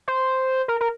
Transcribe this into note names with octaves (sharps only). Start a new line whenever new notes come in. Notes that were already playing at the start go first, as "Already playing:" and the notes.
C5
A#4
A#4